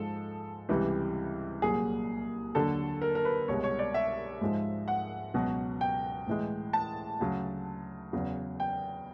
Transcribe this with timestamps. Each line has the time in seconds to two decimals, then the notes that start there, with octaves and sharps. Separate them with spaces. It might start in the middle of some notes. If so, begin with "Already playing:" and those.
Already playing: G#2 F3 G#3 A4
0.69 C#2 C3 E3 G3
1.62 C2 A#2 F#3 G#4
2.55 D#2 D3 F#3 A4
3.02 A#4
3.15 A#4
3.25 B4
3.48 C2 B2 G#3 C#5
3.64 C#5
3.79 D5
3.94 E5
4.41 G#2 F3 G#3
4.88 F#5
5.34 C#2 B2 F#3
5.81 G5
6.27 A2 E3 G#3
6.73 A5
7.20 D2 C#3 F#3
8.13 E2 C#3 F#3
8.60 G5